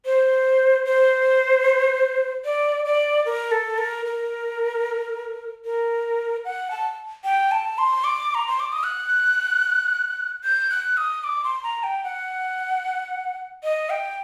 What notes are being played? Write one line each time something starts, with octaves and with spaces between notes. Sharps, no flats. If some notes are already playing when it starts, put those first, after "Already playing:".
C5
C5
D5
D5
A#4
A4
A#4
A#4
A#4
F#5
A5
G5
A5
C6
D6
A#5
C6
D6
D#6
F#6
G6
F#6
D#6
D6
C6
A#5
G5
F#5
D#5
G5